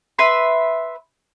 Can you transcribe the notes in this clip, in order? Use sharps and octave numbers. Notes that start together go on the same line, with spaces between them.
B4 E5 C6